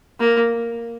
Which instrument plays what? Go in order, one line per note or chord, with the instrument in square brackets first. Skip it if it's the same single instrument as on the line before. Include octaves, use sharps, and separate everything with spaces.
[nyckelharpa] A#3